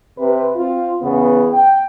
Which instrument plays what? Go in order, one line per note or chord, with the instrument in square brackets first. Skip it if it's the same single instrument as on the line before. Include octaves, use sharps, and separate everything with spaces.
[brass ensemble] C3 B4
C4 F4
E2 C#3 B3
G5